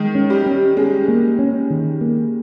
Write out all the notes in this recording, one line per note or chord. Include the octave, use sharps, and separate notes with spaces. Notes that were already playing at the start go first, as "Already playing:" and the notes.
Already playing: D#3 G#3
C#4
G3
C#4
G#3 C#4
A#3
C#4
D#3
A#3